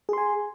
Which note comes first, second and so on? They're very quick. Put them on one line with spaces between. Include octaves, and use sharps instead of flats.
G#4 C6 G#5